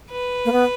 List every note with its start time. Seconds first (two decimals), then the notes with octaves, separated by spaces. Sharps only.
0.12 B4
0.45 A#3
0.52 B3